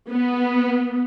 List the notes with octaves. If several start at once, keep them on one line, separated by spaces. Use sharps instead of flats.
B3